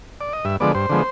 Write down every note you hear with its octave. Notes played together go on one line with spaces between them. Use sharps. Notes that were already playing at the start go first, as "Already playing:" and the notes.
D5
D#5
G2 E5
D3 F3 G#3 B3 D5
G2 C5
D3 F3 G#3 B3